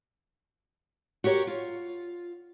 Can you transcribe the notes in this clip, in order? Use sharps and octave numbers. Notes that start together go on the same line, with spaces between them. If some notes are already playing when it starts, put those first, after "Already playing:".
F#4 G4 A#4 C#5
F4